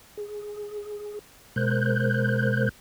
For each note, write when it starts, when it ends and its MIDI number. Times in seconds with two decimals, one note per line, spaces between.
0.17 1.19 68
1.56 2.69 47
1.56 2.69 56
1.56 2.69 70
1.56 2.69 72
1.56 2.69 90
1.56 2.69 91